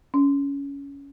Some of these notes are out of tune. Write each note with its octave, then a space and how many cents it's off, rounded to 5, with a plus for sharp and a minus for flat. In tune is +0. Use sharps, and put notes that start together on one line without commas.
C#4 +15